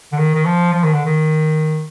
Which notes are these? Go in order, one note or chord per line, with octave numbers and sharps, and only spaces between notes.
D3
D#3
D#3
F3
F3
D#3
D3
D#3